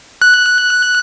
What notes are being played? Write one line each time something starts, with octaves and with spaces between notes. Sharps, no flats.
F#6